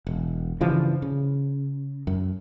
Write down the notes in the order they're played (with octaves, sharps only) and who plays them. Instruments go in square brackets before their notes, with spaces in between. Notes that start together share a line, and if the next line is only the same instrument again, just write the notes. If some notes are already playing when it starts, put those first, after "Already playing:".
[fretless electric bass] E1
G2 C#3 E3 F3
C#3
F#2